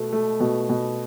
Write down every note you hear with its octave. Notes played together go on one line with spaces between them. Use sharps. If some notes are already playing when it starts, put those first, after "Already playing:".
Already playing: B2 A3
A3
B2
B2